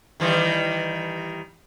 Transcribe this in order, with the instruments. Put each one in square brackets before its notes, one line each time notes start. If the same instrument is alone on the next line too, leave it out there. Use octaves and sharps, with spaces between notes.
[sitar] D#3 E3 G3